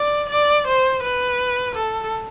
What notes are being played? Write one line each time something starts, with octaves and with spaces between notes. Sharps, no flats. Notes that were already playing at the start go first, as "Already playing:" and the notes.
Already playing: D5
D5
C5
B4
A4